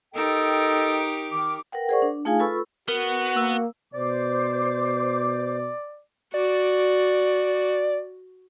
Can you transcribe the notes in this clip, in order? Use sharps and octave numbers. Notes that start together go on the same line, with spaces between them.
D#4 G4 A4 A#4 D#5 G5
D#3 D6
A#4 B4 F#5 G5
G#4 A#4 C5 D5 F#5 C#6
D4
A3 D#4 F4 G#4 F5 G#5
F4 A4 B4 B5 C#6 E6
B3 F#4 A#4
A#3 E6
B2 C5 D5 D6
F#4 D5